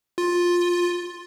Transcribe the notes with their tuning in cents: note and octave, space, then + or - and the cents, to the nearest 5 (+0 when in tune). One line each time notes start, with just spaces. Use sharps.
F4 +10